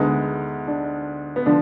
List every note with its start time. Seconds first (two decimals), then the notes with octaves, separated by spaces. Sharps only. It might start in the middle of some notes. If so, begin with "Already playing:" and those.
Already playing: D2 D3 G#3 B3 D#4
0.67 D4
1.36 B3
1.46 D3 F3 D4